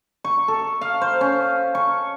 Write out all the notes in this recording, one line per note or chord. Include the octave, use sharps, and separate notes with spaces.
C#6
A4
F5
C5
C#4
C#6